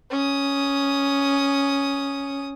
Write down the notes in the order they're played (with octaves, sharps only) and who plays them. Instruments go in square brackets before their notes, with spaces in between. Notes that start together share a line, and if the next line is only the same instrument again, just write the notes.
[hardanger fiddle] C#4 D#6